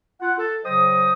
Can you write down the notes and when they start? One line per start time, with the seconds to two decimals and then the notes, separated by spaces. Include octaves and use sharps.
0.22 F4 F#5
0.38 A4
0.65 C#3 F#3 C5 D#5 G5 D#6